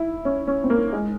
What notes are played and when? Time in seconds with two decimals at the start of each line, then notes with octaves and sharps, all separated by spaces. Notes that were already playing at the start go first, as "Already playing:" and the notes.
Already playing: E4
0.25 C#4
0.47 C#4
0.64 C4
0.70 A#3
0.93 G#3